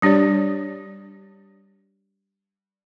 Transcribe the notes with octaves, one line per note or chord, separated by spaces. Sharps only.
G3 D4 G4 C#5 D5